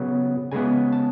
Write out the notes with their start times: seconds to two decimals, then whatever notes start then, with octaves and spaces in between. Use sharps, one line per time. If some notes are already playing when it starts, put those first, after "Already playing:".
Already playing: C#3 F#3 B3
0.52 C#3 G#3 B3 G#5
0.93 A5